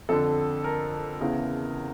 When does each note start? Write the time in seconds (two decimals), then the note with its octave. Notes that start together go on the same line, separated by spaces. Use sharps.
0.09 F2 D3 A4
0.64 A#4
1.20 E2 C#3 E3